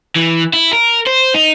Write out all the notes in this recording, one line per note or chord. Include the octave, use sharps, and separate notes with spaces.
E3
E4
A#4
C5
D#4